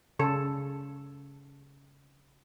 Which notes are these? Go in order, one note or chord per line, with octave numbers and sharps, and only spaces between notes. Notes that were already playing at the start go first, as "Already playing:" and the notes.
C#3 A4